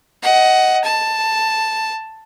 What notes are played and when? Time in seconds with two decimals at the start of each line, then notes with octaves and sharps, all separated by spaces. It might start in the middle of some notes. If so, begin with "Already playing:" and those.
0.23 D#5 F#5
0.84 A5